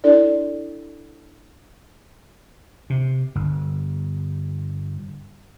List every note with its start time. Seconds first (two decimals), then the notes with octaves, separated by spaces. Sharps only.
0.04 D4 E4 A4 D5
2.90 C3
3.35 G1